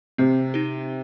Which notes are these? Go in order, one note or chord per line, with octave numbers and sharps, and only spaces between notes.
C3 C4
D#4 G4